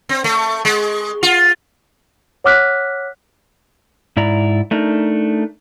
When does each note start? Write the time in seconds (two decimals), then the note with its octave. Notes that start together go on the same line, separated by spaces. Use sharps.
0.09 C4
0.24 A3
0.65 G#3
1.23 F4
2.44 C#5 F#5 D6 F6 F#6 B6
4.17 G#2 E4 D5 A#5
4.71 A3 D4 D#4 A#4